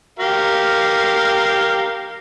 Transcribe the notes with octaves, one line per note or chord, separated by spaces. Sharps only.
G4 A#4 F5